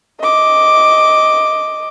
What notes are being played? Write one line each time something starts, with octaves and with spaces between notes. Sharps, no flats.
D#5 D6